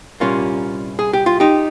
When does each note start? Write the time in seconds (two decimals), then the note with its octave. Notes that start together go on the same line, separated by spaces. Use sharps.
0.20 C2 A#2 G3 A#3 C#4 F4
0.99 G#4
1.13 G4
1.26 F4
1.40 D#4 G4